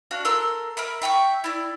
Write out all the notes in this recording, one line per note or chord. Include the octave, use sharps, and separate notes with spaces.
D4 F#4 F5
A4 A#4 C6 E6
A#4 E5 B5
E5 G5 A#5 C#6
E4 D5